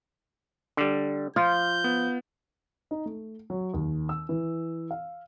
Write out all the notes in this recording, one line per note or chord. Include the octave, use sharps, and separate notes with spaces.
D3 G3
F3 F4 G6
B3
D#4
A3
F#3
D#2
E6
E3
F5